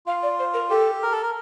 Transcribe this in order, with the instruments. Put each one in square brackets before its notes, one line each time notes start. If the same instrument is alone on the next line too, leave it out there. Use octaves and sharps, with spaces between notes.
[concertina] F4 [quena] F5
[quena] D5
C5
A#4
[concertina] G4 [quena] A4
[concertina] A#4
A4
A#4